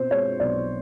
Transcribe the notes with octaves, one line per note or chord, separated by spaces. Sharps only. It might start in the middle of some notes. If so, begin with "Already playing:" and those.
Already playing: B2 C4 C5
G#3 C#5
B1 D5